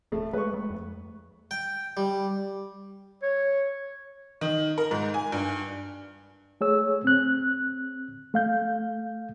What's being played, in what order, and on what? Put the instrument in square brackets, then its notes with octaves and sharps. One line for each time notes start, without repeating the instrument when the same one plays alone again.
[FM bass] D1 [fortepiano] A2 A3
[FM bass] G#3 [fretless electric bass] A3 [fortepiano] B4 C#6
[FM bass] G#3
F2
[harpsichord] G5
G3
[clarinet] C#5
[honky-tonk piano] D#3
A#4
G#2
G#5
G2
[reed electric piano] A3 G#4 C#5 E6
C4 F#6
A3 F5 G6